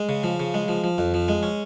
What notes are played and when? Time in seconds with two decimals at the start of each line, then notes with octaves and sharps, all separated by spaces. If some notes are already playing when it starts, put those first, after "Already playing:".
Already playing: G#3
0.09 C#3
0.23 F3
0.40 C#3
0.54 G#3
0.68 F3
0.84 F3
0.98 F2
1.14 F3
1.28 G#3
1.43 C#4